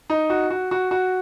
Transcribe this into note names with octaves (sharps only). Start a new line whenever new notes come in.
D#4
F#4
F#4
F#4
F#4